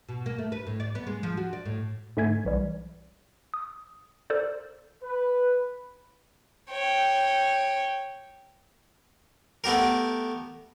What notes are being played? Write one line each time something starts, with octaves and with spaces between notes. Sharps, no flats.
B2
A#3
A3
B4
A2
D5
B3
G#3
F3
F#4
D5
A2
G#2 D3 A3 E5 G#5 G#6
B1 E3 G3
D#6
A4 A#4 C5 D5
B4
C#5 G5
A3 B3 G4 A#4